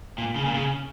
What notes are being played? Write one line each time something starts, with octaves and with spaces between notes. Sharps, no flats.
A#2
C#3
A#2
C#3